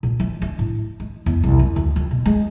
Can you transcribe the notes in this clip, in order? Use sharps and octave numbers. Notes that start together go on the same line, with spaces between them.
A#2
F3
D4
A2
G#3
E2
C2
F2
D2
F2
B2
G#3